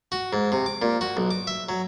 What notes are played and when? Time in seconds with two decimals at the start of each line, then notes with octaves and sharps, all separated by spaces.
0.12 F#4
0.33 G#2
0.52 C3
0.66 D6
0.82 A#2
1.01 F#4
1.17 B1
1.31 D6
1.47 E5
1.69 F#3